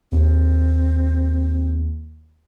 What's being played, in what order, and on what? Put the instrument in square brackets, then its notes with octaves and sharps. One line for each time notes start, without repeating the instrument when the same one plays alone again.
[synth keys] D#2 [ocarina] C4